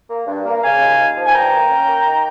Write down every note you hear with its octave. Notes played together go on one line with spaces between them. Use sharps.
A#3
G2
A#3
C#3 F5 G#5
D#2
D#2
F3
G#5
G2 G5 A#5
A#3
C#4
A#3
D#3